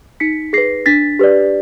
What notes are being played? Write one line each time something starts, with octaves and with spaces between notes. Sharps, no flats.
D#4 B6 C#7
G#4 B4 A#6 C7
D4 A6 B6
G4 B4 D5